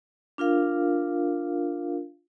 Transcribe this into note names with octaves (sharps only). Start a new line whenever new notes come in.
D4 F4 A#4 F5